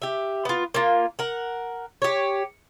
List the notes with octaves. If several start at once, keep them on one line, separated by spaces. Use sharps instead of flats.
G4 E5
B3 F4
A#3 F4
A#4 F#5
G4 C#5